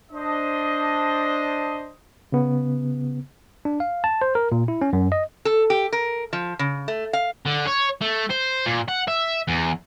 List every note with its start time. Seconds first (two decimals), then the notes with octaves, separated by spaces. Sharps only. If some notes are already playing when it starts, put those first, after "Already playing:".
0.12 D4 C5 D#5
2.32 C#3 B3
3.65 D4
3.80 F5
4.04 A5
4.22 C5
4.35 A#4
4.52 A#2
4.68 E4
4.82 C#4
4.93 F#2
5.12 D#5
5.45 A4
5.70 G4
5.93 A#4
6.33 F3
6.59 C#3
6.88 A3
7.13 F5
7.46 D3
7.67 C#5
8.02 A3
8.30 C5
8.66 A#2
8.88 F#5
9.08 E5
9.48 E2